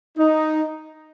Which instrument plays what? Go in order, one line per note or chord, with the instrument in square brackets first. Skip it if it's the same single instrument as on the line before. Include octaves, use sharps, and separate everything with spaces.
[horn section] D#4